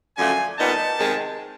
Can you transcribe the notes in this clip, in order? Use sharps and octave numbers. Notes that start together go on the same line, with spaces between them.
F#2 D3 F3 A3 G#5
A#2 G3 B3 D#4 A5
C3 D#3 G#3